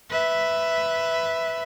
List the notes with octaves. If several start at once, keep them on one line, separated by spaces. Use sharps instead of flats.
B4 E5